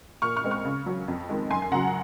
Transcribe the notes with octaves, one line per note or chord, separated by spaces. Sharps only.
A#2 C#6 F6
C#6 F6
G#3 C4
C#6 F6
C#3
F#3 C#4
F2
D#3 G#3
F#2 G#5 C6
G#5
C#3 F#3 F#5 A#5